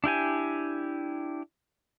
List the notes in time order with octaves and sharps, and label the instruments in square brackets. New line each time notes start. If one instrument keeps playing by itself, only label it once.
[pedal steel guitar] D4 E4 G4 G#5